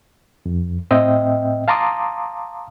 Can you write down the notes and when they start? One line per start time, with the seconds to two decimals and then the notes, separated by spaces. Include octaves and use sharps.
0.46 F2
0.91 A2 C4 D#5 E5 G5
1.68 F5 A5 A#5 C6 D6 D#6